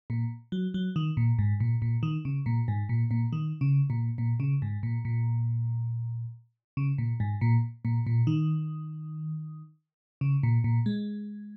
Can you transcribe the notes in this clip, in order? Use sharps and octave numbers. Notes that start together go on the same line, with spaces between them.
A#2
F#3
F#3
D#3
A#2
G#2
A#2
A#2
D#3
C#3
A#2
G#2
A#2
A#2
D#3
C#3
A#2
A#2
C#3
G#2
A#2
A#2
C#3
A#2
G#2
A#2
A#2
A#2
D#3
C#3
A#2
A#2
G#3